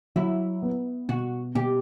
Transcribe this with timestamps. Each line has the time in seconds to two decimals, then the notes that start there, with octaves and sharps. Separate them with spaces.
0.16 F#3 E4
0.62 B3
1.09 B2 F#4
1.55 B2 G4